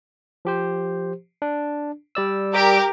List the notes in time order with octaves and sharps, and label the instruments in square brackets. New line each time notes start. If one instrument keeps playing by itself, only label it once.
[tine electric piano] F3 G4 C5
D4
G3 D5 E6
[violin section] G4 A#4 D6